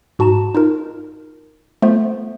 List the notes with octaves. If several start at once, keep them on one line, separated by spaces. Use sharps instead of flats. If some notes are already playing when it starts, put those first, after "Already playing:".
G#2 F#4 A5 A#5 E7
D#4 F4 A#4
A3 B3 F4 C5